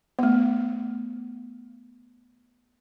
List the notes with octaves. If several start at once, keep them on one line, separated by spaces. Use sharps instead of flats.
A3 B3